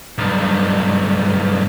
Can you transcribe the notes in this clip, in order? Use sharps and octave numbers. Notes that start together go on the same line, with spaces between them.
B1 G2